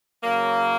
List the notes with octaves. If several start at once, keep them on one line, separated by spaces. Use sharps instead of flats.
C#3 F#3 A#3